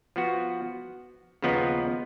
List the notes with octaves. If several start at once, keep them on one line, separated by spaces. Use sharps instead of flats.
F3 B3 F#4
D#2 C#3 F3 B3 D#4